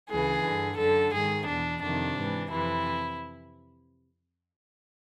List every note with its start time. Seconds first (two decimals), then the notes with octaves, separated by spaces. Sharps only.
0.10 D2 C#3 E3 G#4
0.44 G2 D3
0.79 F#2 D3 A4
1.13 G#2 D#3 G#4
1.48 E2 B2 D4
1.83 F2 C3 D#3 D4
2.17 G#2 E3
2.52 F2 C3 E3 E4